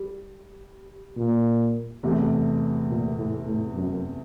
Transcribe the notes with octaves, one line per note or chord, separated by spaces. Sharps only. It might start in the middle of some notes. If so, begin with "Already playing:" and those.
Already playing: G3
A#2
E2 C3 E3 A3
A#2
A2
A2
F#2